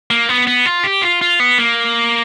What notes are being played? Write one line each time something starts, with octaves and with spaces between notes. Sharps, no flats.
A#3
B3
B3
F4
G4
F4
F4
B3
A#3